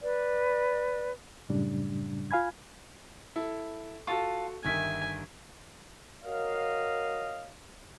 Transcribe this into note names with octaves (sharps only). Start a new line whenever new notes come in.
B4 D5
F#2 A2 C#3 G3 D4
F4 F5 G#5 B5 G#6
E4 A4
F4 F#4 A4 A5 C#6
G1 D#3 E5 G#5 B6
F#4 A#4 C#5 D#5 F5